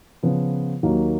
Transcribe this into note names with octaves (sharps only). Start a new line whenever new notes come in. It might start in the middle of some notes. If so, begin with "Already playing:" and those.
C#3 F3 B3 F4
D#2 D#3 F#3 A#3